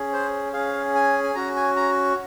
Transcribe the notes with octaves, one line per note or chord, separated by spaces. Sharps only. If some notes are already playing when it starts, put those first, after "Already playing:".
Already playing: C#4 G#4
C5
C#4 G#4 F5
G#5
G#5
C#4 F#4 A#5
G#5
A#5